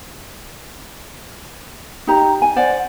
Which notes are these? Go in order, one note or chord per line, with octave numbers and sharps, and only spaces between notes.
D#4 G4 A#5
G#5
C5 D5 F#5